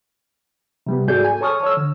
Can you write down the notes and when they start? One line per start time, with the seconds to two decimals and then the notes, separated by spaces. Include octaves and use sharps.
0.87 C3 G3 B3
1.08 G#2 F#4 G#4 A4 D5 G6
1.25 G#5
1.41 A4 C#5 A5 C#6 D#6 F6
1.63 C#5 E6
1.77 D3